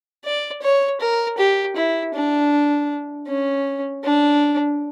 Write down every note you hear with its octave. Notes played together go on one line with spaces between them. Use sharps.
D5
C#5
A#4
G4
E4
D4
C#4
D4